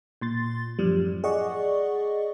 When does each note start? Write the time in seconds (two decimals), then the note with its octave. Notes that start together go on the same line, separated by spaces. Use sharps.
0.21 A#2 C6 A6
0.79 F#2 A2 F3 G3
1.24 G#4 D5 D#5 F#5 C#6